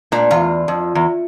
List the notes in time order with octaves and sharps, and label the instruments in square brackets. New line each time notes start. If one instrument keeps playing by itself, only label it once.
[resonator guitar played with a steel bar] A#2 [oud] D4
[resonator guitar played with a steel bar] E2 [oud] F4
[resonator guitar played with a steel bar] F2
E2